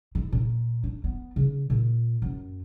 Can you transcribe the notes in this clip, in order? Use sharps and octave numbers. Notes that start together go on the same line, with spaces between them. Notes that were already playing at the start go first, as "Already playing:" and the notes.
D#3
A#2
D4
B3
C#3
A#2
F#2